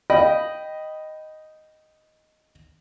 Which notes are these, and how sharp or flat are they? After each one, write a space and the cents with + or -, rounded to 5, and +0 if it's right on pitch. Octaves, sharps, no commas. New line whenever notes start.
D#5 +0 G5 -10 B5 +0